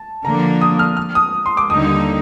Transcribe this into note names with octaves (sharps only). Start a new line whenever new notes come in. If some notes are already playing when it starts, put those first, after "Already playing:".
Already playing: A5
D3 F3 A#3 D4 A#5
D#6
F6
F6
D#6
C6
D6
D#2 D3 G3 A#3 D#4 D#6